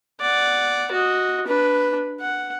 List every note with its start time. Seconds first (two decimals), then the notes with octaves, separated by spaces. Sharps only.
0.21 D5 F#5
0.92 F#4 D#5
1.47 D4 B4
2.21 F#5